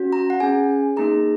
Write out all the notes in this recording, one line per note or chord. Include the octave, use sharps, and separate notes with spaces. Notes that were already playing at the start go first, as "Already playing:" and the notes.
Already playing: C#4 F#4
A#5
F#5
C#4 G#4 G#5
A#3 D#4 G#4 A#5